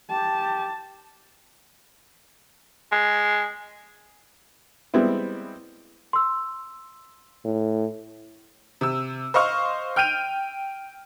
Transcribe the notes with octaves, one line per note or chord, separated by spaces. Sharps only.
G4 A5
G#3
G3 G#3 B3 C4 E4
C6 E6
A2
C3 E6
C5 D#5 F5 C#6 F6
G5 F6 G6 D7 D#7 F7